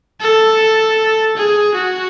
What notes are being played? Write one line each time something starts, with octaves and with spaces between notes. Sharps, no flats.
A4
G#4
F#4